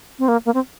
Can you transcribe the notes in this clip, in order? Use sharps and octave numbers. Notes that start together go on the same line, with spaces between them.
C4
A#3
A#3
C4